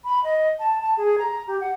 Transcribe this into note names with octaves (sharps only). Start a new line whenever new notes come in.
B5
D#5
A5
A5
G#4
A#5
G4
F#5